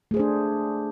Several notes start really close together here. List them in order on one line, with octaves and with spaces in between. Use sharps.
A3 G#4 C5 D4